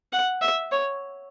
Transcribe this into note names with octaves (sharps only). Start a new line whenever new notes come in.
F#5
E5
C#5